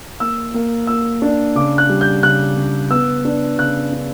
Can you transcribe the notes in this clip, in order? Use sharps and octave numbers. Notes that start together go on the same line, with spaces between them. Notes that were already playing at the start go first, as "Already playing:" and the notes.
A#3 E6
A#3
A#3 E6
D4
C#3 D6
F#6
G3
G6
C#3 F#6
C#3
B3 E6
D4
C#3 F#6
D4